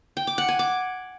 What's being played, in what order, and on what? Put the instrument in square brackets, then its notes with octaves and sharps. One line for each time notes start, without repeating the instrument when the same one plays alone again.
[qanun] G5
D6
F#5
G#5
D6